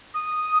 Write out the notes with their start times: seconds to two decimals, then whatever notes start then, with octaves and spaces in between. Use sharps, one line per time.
0.14 D#6